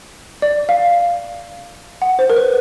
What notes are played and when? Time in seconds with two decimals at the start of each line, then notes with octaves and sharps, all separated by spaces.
0.42 D5
0.69 F5
2.02 F#5
2.19 C5
2.30 A#4
2.36 B4